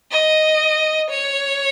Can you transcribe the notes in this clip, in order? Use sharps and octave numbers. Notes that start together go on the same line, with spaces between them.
D#5
C#5